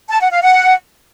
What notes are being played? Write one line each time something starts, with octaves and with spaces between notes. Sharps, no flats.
A5
F#5
F5
F#5